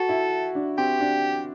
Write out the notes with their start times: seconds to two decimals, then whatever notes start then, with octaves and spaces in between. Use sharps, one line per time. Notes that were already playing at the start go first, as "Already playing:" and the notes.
Already playing: F#4 A4
0.09 E4
0.55 D4
0.78 C4 G4
1.00 D4